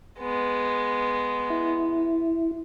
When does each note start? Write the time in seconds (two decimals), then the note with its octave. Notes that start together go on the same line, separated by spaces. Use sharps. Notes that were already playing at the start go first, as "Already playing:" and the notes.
0.20 G#3 B3
1.50 E4